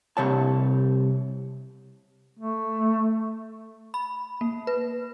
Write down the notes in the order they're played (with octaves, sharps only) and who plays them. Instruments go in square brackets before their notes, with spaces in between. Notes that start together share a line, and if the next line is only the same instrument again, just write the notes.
[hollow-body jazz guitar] C2 C3 C#5 A5
[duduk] A3
[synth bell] B5
A#3
B4